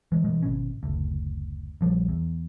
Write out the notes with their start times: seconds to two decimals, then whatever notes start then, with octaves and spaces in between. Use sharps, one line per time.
0.12 E3 G#3
0.24 G2 B2 E3 G#3
0.43 G#1 B2 C#4
0.83 F#1 D2
1.81 A#1 F3 G3
2.08 E2